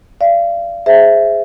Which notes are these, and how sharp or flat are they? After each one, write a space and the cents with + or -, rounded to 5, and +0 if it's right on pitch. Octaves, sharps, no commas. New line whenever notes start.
D5 +0 F5 -35
G#4 +0 C5 -15 E5 +10